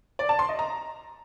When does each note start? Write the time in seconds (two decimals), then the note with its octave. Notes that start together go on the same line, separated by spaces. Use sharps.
0.19 D5
0.29 A5
0.39 C6
0.49 D#5
0.59 A#5